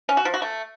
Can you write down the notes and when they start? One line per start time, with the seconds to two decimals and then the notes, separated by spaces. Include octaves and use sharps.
0.09 C#4
0.17 F#4
0.25 F3
0.34 F#4
0.42 A3